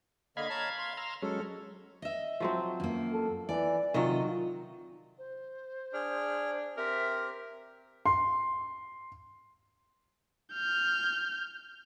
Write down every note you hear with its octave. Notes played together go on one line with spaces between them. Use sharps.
D3 A#3 D#5 F5 B5 G#6
C#5 A5 A#5
C6
A#5 E6 F6
F#3 G#3 C#4 A4
D#5 E5
F3 F#3 C4
F#2 A#3
A4
E3 D5
C3 D#3 F#3 F4 A4 D#5
C5
D4 G#4 F6
C4 G4 A#4 E5
C6
F6 G6